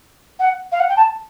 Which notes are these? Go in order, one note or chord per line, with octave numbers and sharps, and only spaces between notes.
F#5
F5
F#5
G5
A5